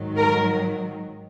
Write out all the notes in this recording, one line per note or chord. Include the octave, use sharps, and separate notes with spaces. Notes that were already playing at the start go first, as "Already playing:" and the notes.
Already playing: G#2 D#3 F#3
A#4